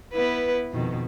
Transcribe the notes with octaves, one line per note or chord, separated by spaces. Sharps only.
B3 E4 B4
F2 B2 D#3